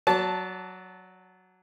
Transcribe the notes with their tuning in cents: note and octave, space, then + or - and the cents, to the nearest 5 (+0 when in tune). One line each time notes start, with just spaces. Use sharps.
F#3 +0 D5 -30 A5 +0